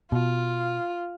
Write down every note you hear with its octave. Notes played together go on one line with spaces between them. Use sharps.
B2 F4